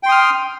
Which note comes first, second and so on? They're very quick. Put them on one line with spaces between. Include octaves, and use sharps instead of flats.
G5 C6 D#6 F6